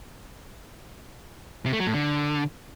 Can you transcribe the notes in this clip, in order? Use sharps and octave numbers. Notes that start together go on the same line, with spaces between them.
C3
A3
F#3
A2
D3